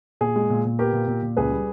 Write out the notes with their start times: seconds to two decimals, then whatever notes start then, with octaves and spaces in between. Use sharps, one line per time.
0.21 A#2 G#4
0.36 G#3
0.50 A#2
0.65 A#2
0.79 B3 G4 A#4
0.93 A#2
1.08 A#2
1.23 A#2
1.37 C#2 G#4 B4
1.51 G3